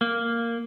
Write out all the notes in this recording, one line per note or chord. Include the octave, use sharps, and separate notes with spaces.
A#3